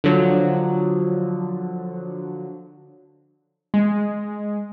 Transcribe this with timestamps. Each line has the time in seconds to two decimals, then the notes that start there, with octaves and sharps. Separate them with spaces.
0.04 D3 F3 F#3
3.74 G#3